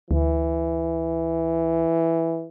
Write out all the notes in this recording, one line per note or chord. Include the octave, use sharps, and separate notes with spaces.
D2 E3